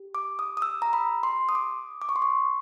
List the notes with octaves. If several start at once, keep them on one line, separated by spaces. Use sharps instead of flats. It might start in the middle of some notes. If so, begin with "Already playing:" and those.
Already playing: G4
D6
D#6
D#6
E6
A#5
B5
C6
D#6
D6
D6
C#6
C6
C#6